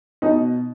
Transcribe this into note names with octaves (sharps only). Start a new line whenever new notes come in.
B2 D#4